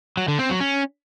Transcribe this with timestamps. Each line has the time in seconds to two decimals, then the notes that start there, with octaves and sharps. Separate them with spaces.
0.17 F#3
0.28 D3
0.39 C4
0.50 F#3
0.60 C#4